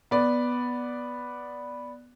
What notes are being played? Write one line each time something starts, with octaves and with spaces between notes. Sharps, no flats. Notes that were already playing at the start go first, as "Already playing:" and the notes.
B3 D5